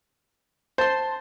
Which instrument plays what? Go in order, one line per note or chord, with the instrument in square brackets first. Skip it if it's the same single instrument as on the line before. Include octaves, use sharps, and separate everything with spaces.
[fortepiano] C5 [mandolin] A5 C6